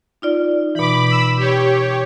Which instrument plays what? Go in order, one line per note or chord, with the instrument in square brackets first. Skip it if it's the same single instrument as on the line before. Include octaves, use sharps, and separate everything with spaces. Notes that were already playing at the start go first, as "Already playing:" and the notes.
[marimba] D#4 F4 D5
[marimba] B2 E3 [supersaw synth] B5 D6
[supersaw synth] B5 E6
G4 C#5